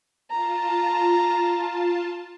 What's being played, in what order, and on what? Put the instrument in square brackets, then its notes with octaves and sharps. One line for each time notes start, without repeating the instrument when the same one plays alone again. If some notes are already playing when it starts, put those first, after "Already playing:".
[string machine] F4 A5 [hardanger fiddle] A#5